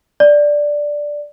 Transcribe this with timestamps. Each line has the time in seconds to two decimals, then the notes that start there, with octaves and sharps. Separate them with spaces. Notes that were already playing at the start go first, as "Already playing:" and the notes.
0.20 D5